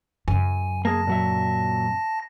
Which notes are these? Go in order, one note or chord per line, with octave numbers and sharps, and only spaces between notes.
F#2 C#3 G#5
A#3 G#4 A5 A#6
A#2 F#3 E5